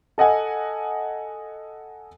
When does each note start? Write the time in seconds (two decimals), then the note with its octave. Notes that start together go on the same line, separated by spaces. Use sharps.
0.18 A4 D#5 F#5 G#5